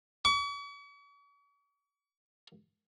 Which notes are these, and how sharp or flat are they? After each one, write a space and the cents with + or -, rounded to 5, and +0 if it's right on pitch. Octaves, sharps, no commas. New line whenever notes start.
C#6 +45